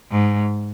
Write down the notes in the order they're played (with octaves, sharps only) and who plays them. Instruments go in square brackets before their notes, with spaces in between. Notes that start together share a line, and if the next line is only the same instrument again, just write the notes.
[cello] G#2